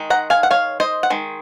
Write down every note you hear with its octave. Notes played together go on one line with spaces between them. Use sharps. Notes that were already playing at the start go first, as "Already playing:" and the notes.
Already playing: D#3 G#3 D#4
F#5 A#5
F5 G#5
F#5
C#5 F5
C5 D#5
F#5
D#3 G#3